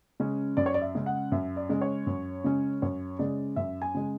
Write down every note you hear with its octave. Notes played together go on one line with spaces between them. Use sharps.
C#3 G#3 C#4
F#2 D5
C#5
D5
E5
C#3 G#3 C#4
F#5
F#2 E5
D5
C#3 G#3 C#4
C#5
F#2
C#3 G#3 C#4
F#2 C#5
C#3 G#3 D5
F#2 E5
G#5
C#3 G#3